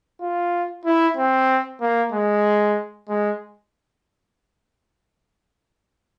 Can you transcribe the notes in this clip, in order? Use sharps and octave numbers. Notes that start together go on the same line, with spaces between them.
F4
E4
C4
A#3
G#3
G#3